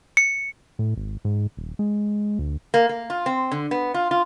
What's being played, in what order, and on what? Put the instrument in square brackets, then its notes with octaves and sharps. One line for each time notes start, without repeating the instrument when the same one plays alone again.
[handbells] C#7
[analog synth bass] A2
G#1
G#2
D#1
G#3
D2
[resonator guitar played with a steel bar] A#3
A#3
F4
C4
D3
B3
F4
F4